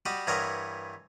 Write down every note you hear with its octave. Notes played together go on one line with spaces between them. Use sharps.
G3 F#4 D5 D#5
G2 E3 A#4 C#5 D#5 F#5